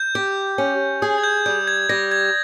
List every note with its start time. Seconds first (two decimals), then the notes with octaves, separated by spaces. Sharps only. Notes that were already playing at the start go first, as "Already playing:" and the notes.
Already playing: G6
0.15 G4
0.58 C#4
1.02 G#4 D#6
1.18 G#6
1.24 G6
1.46 G3 G6
1.67 G#6
1.89 G3 A#6
2.11 G#6